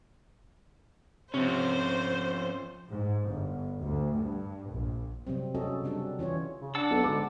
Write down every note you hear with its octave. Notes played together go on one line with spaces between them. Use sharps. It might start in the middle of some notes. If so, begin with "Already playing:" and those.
C3 F3 C#4 C5
G#2
G1
D2
G2
A#1
C3 F#3 G3 C4
C#4 F#4 G#4 A4 D#5
C#3 G3 D4 F#4 A4
E3 C#4 F4 C#5
C#3
D4 F#5 A5 E6
B1 A4
G#2 D3 D6